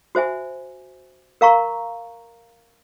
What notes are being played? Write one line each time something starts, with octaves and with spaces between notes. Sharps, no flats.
F#4 C5 E5 G#5
A#4 F5 A#5 C#6